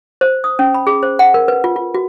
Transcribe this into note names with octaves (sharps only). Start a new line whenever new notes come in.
C5
D#6
C#4
B5
G#4
C5
F#5
A#4
B4
F4
F4
F#4